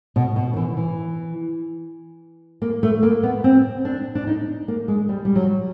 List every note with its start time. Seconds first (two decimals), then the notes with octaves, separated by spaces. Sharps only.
0.16 B2
0.36 B2
0.53 D#3
0.56 E3
0.77 E3
2.62 A#3
2.83 A3
3.03 A#3
3.23 B3
3.44 C4
3.85 D4
4.15 D4
4.27 D#4
4.68 A#3
4.88 G#3
5.09 G3
5.25 G3
5.36 F#3